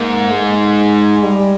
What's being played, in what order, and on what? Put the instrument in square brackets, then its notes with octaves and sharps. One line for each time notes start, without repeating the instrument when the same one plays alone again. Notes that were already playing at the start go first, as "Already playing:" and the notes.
Already playing: [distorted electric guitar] G#2 [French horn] A#3
[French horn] G#3
G3